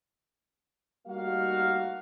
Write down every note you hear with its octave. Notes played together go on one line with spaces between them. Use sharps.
G3 A3 A#3 D#4 F#4 F5